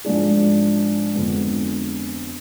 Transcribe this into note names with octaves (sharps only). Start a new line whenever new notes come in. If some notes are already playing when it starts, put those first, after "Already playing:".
G#2 F3 G#3 D4 G#4
F2 D3 G#3 B3